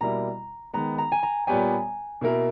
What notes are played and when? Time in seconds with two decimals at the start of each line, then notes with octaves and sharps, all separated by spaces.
0.01 B2 G3 A#3 E4 A#5
0.74 D#3 G#3 B3 A#5
0.98 A#5
1.12 G#5
1.23 A#5
1.47 A#2 G3 B3 G4 C#5 G#5
2.21 B2 A#3 E4 A#4